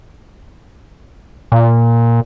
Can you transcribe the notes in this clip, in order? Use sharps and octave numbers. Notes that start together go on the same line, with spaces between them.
A#2